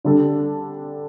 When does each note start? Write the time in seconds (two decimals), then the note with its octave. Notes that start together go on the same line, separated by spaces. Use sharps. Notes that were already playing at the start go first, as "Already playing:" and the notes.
0.05 D3 G3 D4 A4